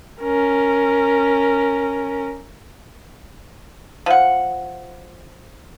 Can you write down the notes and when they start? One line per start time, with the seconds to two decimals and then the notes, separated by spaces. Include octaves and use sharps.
0.21 C#4 A#4
4.06 F3 F#5